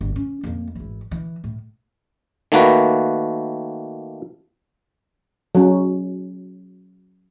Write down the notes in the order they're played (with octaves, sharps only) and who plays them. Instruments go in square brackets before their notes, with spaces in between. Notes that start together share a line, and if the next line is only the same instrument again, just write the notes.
[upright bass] G1
C#4
F2 A#3
G#1 E3
E3
A2
[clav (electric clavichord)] D#3 A3 A#3 F#4 B4
[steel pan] F#3 C#4